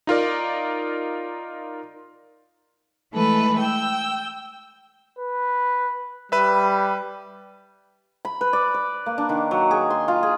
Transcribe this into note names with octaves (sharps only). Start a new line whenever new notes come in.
D#4 F4 A#4 D5
E3 G#3 A3 A4 B4
G5 E6
B4
G3 B4 E5
B5
B4
D5
D5
A#3
D4
D#3
F#3
G#4
C6
F4
G#4